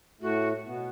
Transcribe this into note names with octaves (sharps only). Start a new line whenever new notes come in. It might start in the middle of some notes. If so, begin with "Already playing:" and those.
A2 A3 F#4
B2 B3